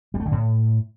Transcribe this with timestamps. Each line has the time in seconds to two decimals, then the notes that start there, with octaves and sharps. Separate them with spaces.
0.14 G3
0.20 A3
0.26 D3
0.32 A2